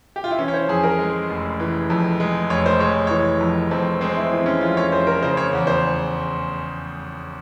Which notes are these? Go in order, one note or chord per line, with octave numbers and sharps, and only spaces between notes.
G4
F4
E4
E3 C#4
C#5
C5
F2 G#4
A#4
G#3
F1
E3
F2
G#3
F1 C#5
C5
G#3 C#5
E3 C#5
F2
F2 C4
G#3 C4
E4
E3 C4
C#4
F2 F4
C#5
F2 C5
A#4
C#3 C5
C#5
E2
C5